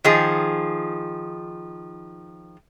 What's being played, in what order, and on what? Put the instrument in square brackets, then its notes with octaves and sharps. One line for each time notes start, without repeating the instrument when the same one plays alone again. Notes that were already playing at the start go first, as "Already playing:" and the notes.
[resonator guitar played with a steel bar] D#3 F3 G#4